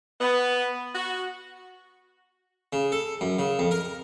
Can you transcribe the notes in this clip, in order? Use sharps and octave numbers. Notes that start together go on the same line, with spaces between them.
B3
F#4
C#3
A4
F#2
C#3
F2
A#4